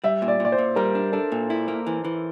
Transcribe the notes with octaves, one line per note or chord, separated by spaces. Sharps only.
G3 E5
A#2
D5
A#2 D5
C5
A#2
G3 A#4
D4
D4 A4
A#2
E4
A#3
E3
E3